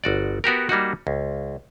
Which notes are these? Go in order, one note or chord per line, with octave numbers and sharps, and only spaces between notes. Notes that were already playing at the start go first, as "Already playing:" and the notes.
G1 F#4 D5
B3 F#4 G4 A#4
G3 A#3 D#4 F#4
C#2